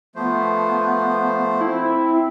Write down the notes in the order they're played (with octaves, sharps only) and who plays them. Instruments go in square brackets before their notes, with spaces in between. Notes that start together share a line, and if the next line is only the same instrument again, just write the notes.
[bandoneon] F3 A3 C5 [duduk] B3
[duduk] C4 [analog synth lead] E4